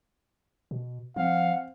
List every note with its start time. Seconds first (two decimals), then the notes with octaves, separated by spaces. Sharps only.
0.71 B2
1.16 F3 C4 F5 F#5